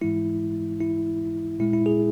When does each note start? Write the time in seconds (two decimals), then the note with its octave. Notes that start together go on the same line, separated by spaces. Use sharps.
0.01 G#2 E3 G#3 E4
0.80 E4
1.60 A#2 G#3 E4
1.73 E4
1.86 G#4